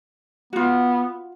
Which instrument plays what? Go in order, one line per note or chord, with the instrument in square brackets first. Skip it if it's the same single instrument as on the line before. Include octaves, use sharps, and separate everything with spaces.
[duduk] B3 [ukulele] F4 F#4